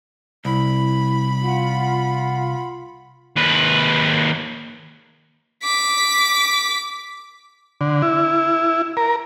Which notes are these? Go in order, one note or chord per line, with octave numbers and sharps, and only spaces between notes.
C2 E4 B5
F4 F#5
D#2 B4
D6 B6
D3
E4
A#4